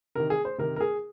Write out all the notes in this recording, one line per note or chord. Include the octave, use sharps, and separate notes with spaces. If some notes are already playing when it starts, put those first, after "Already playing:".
C3 D#3 A#4
G#4
C5
C3 D#3 A#4
A#4
G#4